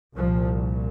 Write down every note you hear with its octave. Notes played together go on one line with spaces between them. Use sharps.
C2 A#2 F3